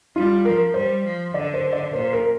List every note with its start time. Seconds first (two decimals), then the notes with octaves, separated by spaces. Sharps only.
0.16 G3 F4
0.45 F3 A#4
0.74 G3 C5
1.04 F3
1.34 D3 D5
1.54 C5
1.73 D5
1.93 A#2 C5
2.13 A#4